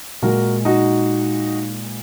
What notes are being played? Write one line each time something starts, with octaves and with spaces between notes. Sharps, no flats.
A#2 G#3 F#4 A#4
D#4 F#4